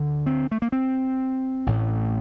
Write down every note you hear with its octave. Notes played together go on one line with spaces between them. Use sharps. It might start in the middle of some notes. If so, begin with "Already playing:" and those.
Already playing: D2 D3
C4
A3
A#3
C4
A1 A2